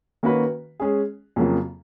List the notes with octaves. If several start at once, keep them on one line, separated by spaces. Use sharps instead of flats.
D#3 A#3 C#4 F#4 B4
G#3 C#4 G#4
F2 C#3 F#3 A#3 F4